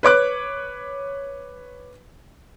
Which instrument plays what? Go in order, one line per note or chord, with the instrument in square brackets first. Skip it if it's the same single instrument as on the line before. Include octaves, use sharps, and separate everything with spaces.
[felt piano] B4 C#5 D6 F#6